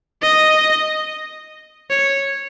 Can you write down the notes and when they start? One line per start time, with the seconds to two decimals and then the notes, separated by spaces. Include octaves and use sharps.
0.23 D#5
1.91 C#5